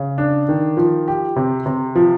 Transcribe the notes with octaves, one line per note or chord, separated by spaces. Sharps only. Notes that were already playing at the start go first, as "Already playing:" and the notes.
Already playing: C#3
D4
D#3
F3
G4
C3
C3
F3